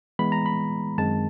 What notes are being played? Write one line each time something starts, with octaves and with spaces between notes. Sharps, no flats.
E3 G#3 B3 B5
A#5
B5
F#2 D#3 G#3 C4 A5